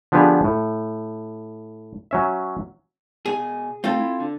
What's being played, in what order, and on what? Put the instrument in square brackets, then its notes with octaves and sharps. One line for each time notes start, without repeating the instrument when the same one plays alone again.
[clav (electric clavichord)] D3 F3 B3 D4 G4 G#4
A2
F#3 C#4 E5
[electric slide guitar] B2 C#5 G#5 [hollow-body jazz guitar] G#4
[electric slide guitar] A3 [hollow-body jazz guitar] C4 F4 A4
[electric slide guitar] E4
D3